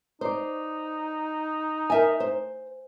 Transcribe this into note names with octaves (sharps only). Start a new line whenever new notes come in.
D#4 C5 D5
A#4 E5 G#5
C5